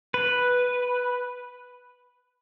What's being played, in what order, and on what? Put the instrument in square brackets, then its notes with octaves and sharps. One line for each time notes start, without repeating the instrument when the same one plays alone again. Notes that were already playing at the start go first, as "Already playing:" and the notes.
[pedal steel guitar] B4